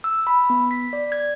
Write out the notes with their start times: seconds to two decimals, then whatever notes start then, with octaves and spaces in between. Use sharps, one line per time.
0.04 E6
0.27 B5
0.50 B3
0.71 B6
0.93 D5
1.12 G#6